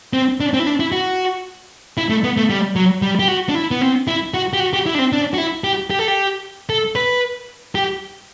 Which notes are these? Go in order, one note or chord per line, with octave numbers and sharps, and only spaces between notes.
C4
D4
C4
E4
D4
E4
F#4
E4
A3
B3
A3
G3
F#3
G3
G4
F#4
D4
E4
B3
C4
E4
F#4
G4
F#4
G4
E4
D4
C4
D4
F#4
E4
G4
G4
A4
G4
A4
B4
G4